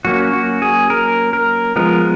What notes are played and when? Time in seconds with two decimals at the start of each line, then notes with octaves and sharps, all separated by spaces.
0.05 F#3 A#3 C#4 F#4
0.33 F#4
0.62 G#4
0.90 A#4
1.33 A#4
1.76 F3 G#3 B3 A#4